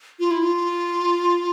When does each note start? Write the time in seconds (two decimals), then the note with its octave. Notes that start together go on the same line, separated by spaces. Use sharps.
0.19 F4
0.31 E4
0.42 F4